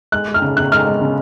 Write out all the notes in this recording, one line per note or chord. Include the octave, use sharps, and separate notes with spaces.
G#3 F#6
G#3
F6
C#3
C#3 F#6
G#3 F6
G#3
C#3